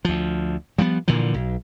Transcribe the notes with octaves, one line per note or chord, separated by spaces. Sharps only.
D2 F3
F3 G3 G#3 B3
A#2 D3 E3 F3
B1